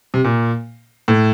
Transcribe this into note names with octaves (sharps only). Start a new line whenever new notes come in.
C3
A#2
A2